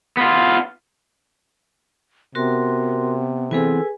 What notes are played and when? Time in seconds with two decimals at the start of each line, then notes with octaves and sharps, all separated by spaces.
0.17 B3 F4
2.35 C3 B3 F#4 A#4 C6
3.51 E3 B3 C4 G#4 A4 B4 G#5